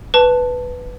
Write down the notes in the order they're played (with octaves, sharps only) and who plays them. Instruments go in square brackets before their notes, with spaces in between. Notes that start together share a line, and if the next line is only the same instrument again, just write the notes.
[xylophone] B4 A5